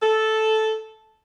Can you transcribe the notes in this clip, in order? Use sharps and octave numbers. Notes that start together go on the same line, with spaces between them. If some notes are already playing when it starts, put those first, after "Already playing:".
A4